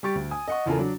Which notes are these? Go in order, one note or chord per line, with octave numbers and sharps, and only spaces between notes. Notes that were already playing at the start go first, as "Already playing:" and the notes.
G3 G4 C#6 A6 D7
D2
G#5 D#6
D#5 F#5 C#6
E2 C#3 F4 A4 A#4 G#5
F#3 D4